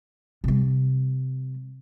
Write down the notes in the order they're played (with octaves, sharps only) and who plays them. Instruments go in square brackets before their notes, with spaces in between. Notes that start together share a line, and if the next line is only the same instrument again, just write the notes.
[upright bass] C3 G3